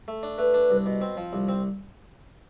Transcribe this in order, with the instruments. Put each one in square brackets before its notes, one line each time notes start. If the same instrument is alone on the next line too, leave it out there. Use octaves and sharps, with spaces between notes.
[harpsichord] A3
D4
[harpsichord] A3 [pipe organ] B4
[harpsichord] D4
C2
B2
C4
F3
C2
C4